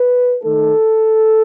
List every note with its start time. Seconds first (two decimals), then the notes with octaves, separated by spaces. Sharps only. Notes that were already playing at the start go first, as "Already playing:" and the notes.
Already playing: B4
0.43 D#3 A3 D#4 A4